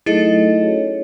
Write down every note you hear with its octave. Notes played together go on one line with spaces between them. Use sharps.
F#3 A3 D#4 E4 G#4 A4 D#5
C#4 F#4 C#5